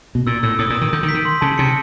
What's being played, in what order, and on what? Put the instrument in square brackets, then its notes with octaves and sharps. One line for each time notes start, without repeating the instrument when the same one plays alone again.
[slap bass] B2
[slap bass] A#2 [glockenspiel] E6
[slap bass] A2 [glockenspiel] E6
[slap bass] A2 [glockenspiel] D#6
[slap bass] A#2
[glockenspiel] D#6
[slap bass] D#3
[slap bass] D3 [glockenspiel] G6
[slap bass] D#3
[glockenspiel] B6
[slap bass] D#3
[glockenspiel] C6
[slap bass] C#3 [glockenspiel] A5
[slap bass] C3 [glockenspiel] C#7